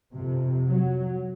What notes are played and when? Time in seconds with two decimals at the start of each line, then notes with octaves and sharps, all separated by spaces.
0.13 F2 C3
0.67 F#3